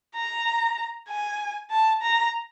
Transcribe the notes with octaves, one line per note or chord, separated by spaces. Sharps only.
A#5
G#5
A5
A#5